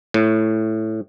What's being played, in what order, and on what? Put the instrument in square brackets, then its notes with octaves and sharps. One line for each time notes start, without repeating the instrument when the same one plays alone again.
[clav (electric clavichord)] A2